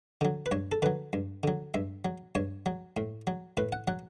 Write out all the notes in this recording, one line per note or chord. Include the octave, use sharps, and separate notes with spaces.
D3 F#3
B4
G2 C#5
A4
D3 F#3 B4
G2
D3 F#3
G2 E5
F#3
G2 C#5
F#3
A2
F#3
A2 B4
F#5
F#3 F#5